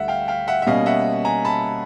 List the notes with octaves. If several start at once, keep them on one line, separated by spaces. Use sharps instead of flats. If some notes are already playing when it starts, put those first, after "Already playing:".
Already playing: D2 D3 G3 E5 F#5
F5 G5
F5 G5
E5 F#5
E5
B2 G3 A#3 C#4 D#5 F5
E5 F#5
G#5 A#5
A5 B5